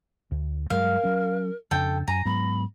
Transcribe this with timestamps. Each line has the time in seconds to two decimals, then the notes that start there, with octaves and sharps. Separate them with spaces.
0.31 D2
0.70 G2 F#3 G#3 A#4 F5
1.03 F#3 C#4
1.71 F2 C#3 D4 A4 G5
2.08 F#2 G#5 A#5
2.25 G#2 F#3 B3 B5